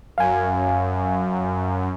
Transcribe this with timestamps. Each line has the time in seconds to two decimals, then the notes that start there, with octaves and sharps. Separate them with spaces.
0.18 F#2 F5 G#5